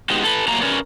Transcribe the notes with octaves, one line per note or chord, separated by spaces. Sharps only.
G#3 B3 D#4 F#4 G4
A4 B4
F#3 A3 A#3 A#5
C#4 A#4 B4 C#5 D5